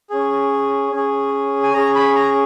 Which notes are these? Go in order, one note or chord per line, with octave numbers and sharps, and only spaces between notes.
C#4 G#4
C#4 G#4
G#5
C#4 G#4 A#5
B5
A#5